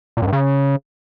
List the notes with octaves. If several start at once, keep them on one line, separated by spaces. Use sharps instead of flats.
A#2
F#2
G2
C#3